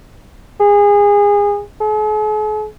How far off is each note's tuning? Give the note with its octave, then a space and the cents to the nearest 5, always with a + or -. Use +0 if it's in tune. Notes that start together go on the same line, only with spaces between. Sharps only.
G#4 -25
G#4 +45